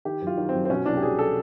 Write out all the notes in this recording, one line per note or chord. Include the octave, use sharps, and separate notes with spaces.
D#3 G4
F#2
F4
D#3
F#2 C4
C4
B2 C#4
C2 D4
G4
B2 G#4
A4